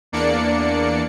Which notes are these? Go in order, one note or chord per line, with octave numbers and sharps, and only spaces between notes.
E2 A#3 D4 D5 C#7